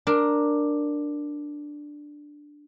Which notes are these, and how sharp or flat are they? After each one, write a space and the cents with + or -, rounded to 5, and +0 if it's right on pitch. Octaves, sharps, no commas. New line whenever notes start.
D4 +5 A#4 +0